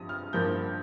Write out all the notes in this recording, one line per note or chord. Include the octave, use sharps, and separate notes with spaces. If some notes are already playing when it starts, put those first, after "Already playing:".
Already playing: G2 F3 D#6
F6
G2 F3 A#3 G6